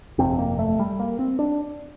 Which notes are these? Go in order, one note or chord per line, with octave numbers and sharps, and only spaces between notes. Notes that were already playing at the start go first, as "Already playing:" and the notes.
G1 F2 C3 C4
A#3
A3
G3
A#3
C4
D4